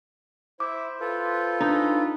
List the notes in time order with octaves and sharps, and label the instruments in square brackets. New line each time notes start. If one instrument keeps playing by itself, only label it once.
[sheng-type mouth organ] E4 E5 [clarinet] C5 [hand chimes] D6
[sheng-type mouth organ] F4 A4 B4
[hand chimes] D4 [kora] D#4